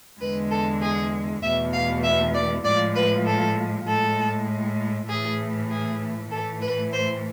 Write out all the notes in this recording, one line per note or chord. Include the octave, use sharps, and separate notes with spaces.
E2 D3 G#3 B4
A4
G#4
E2 B2 A3 E5
F5
E5
D5
A2 F3 G#3 D5
B4
A4
A2 G#3 A4
A2 E3 A3 G#4
G#4
A2 E3 A3 A4
B4
C5